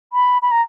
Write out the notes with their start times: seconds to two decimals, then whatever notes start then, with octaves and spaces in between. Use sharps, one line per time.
0.13 B5
0.42 B5
0.51 A#5